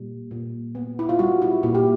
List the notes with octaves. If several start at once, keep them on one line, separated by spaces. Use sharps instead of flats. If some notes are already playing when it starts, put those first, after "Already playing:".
Already playing: A#2 G3
A#2
B3
E4
F4
G3 F#4
E4
A#2 E4
G4